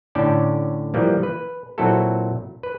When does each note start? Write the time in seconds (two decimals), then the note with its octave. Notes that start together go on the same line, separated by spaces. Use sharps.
0.15 A2 D3 C#4 D5 G5 A5
0.94 E3 F3 G3 A#3
1.23 B4
1.78 A#2 F#3 C4 E4 F#4 A4
2.63 B4